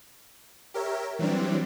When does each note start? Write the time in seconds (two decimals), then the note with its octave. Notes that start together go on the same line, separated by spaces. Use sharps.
0.74 G4 A#4 C#5 E5
1.19 E3 F#3 G3 C4 D4